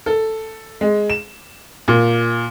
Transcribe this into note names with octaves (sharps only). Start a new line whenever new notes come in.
A4
G#3
E7
A#2